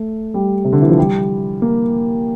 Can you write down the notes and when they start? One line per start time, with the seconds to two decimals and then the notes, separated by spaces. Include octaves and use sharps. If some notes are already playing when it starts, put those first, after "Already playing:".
Already playing: A3
0.34 G3
0.65 C3
0.73 D3
0.82 E3
0.90 F3
0.98 G3
1.62 A#3